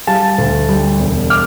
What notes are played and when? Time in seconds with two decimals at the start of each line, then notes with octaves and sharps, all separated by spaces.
0.07 G3 F5 A5
0.38 D2
0.69 G3
1.00 E1
1.30 D6 F6